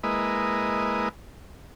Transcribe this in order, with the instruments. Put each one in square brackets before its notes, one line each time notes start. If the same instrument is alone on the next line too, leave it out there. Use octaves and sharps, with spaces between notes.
[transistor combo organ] G#3 A#3 E4 B4 D#5